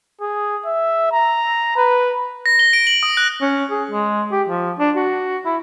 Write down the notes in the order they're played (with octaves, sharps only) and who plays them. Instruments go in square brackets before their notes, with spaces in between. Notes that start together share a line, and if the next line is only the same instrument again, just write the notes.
[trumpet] G#4
E5
A#5
B4
[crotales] A#6
G7
D7
F#7
D#6
F#6
[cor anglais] C#4
G#4
G#3
G4
F3
D4
F#4
E4